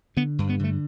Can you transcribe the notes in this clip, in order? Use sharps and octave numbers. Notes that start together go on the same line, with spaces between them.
D3 B3
G2
B3
D3 A3